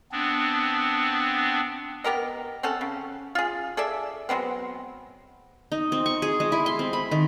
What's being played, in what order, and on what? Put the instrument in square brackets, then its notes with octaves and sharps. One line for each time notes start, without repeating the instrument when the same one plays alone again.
[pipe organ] B3 C4 D4
[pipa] B3 G4 A#4 D#5
C4 C#4 A4 F#5
C#3
F4 G#4
G#4 A4 D5 E5
F#3 G#3 B3 C4
[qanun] D#4
C4
C#6
G#4
G#3
E4
C6
C4
B5
D#3